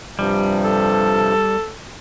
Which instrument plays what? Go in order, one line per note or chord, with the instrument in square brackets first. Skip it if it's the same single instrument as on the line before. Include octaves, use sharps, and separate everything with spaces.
[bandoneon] G2 C3 F3 [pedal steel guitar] G3
[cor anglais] A4